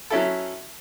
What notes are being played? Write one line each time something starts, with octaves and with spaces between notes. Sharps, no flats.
F#3 C#4 E4 A4